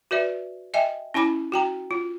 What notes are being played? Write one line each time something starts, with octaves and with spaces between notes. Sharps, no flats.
F#4 B4 D5 E5
D#5 E5 G5 G#5
C#4 E4 G#5 B5 D6
F#4 G5 A#5
F4